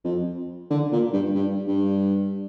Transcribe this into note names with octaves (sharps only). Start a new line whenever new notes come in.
F2
D3
A#2
G2
G2
G2